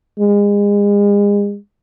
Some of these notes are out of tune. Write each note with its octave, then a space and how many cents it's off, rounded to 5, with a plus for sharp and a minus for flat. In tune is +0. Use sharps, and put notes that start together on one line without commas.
G#3 -35